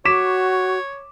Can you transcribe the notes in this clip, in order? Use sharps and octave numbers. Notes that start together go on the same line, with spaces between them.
F#4 C#5 D6 B6 E7